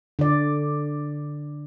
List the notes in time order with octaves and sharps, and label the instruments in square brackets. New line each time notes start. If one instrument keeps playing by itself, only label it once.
[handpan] D3 D5